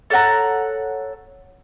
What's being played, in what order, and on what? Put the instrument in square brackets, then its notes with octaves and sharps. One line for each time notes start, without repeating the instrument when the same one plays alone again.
[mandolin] A4 C#5 F#5 A#5